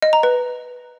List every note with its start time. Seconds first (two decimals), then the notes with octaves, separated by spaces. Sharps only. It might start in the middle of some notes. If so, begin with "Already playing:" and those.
0.02 D#5
0.13 A#5
0.23 B4